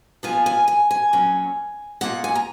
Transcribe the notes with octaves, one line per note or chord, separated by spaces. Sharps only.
A#2 F3 B3 F4 G#5
G#5
G#5
G#5
A#2 F#3 C#4
B2 A#3 F4 F#5
G#5
A#5